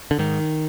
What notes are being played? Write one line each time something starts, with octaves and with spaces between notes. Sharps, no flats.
D3
G#2 D#3